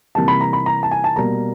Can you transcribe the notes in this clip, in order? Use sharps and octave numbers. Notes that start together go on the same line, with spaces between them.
C3 E3 G3 A#3 A5
B5
A#5
B5
A#5
A5
G#5
A5
B2 G3 A#3 A#5